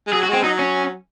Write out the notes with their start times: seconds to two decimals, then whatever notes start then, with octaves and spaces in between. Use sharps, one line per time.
0.07 G#3
0.12 F#3 G#4
0.23 F#4
0.29 G#3 C4
0.43 F#3 D#4
0.59 C#4